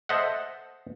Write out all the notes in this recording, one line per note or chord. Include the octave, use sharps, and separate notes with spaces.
A4 C5 D#5 E5 F#5